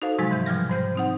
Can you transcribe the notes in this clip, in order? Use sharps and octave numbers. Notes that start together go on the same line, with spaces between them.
D#4 F#4 A4 C5 F5
A2 C3 F3 F#3 G#3
G#2 E3 G6
B2 F3 G3 F6 A#6
G#2 C5 G6
C4 D#4 F#5